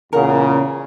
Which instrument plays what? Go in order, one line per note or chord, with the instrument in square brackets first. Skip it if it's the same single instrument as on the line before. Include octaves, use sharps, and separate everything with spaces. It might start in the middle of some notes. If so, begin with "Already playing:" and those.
[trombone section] E2 A#2 C#3 [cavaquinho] A#4 F#5